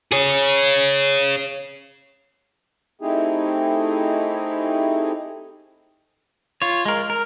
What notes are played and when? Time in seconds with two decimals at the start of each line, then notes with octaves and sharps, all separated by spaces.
0.12 G#4 C#5
3.01 A3 C4 D#4 E4 G4 G#4
6.62 F4 C#5
6.85 G#3 A#4
7.10 A#4